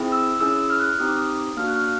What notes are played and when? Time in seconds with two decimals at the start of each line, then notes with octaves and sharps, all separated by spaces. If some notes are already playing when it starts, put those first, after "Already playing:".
Already playing: C4 E4 G#4
0.12 E6
0.41 C#4 E4 G#4 E6
0.70 F6
0.80 F#6
0.89 F6
0.99 C4 D#4 G4 D#6
1.08 D6
1.19 D#6
1.57 A#3 D4 F#4 F6
1.67 F#6
1.76 F6